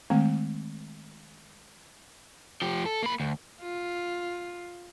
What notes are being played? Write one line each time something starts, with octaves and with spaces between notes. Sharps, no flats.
D#3 G#3 A3 C4
F3 G4
A4
A#3 B5
D2
F4